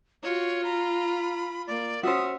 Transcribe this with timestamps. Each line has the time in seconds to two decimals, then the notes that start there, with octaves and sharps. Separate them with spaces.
0.23 F4 F#4 C#5
0.64 A#5 B5
1.67 A#3 D5
2.03 C#4 F#4 C5 E5 D#6